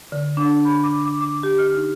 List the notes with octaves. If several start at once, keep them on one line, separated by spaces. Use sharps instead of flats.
D3
D4
B5
D6
D6
D6
G4
F6
D#4